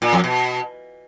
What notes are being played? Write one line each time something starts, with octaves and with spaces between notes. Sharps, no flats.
A#2
F2
B2